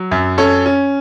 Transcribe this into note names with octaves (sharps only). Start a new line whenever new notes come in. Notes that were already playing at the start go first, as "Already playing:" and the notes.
Already playing: F#3
F#2
C#4 A4 C#5
C#4